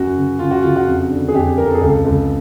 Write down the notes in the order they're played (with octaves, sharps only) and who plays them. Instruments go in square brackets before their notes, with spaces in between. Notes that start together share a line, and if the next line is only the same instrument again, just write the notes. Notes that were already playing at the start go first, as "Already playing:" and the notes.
Already playing: [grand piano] F#2 F#4
C#3
C#3 F4
F#4
C#3 F4
F#4
F2
D3
G#4
F2 G4
F2 A#4
A4
G#4
C#2 A4
C#2